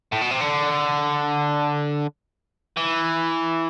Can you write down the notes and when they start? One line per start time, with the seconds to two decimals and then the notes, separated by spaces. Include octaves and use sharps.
0.12 A2
0.21 B2
0.31 C3
0.41 D3
2.77 E3